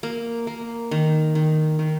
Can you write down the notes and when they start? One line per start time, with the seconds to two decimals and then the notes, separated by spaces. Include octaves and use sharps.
0.03 A#3
0.47 A#3
0.91 D#3
1.35 D#3
1.79 D#3